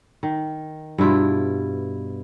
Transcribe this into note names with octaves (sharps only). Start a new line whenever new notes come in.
D#3
G2 B2 E4 F4